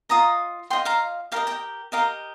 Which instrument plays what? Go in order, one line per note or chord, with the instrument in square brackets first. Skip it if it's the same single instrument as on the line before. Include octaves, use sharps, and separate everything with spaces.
[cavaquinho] F4 D#5 A#5 D#6
F4 D#5 G5 C6
F5 A#5
G4 A#4 D#5 F5 A#5
D#5 G5
G4 A#4 D#5 F5 A#5